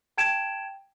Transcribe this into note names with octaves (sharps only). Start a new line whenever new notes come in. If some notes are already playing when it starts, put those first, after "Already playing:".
G5 A5 G#6 D7 E7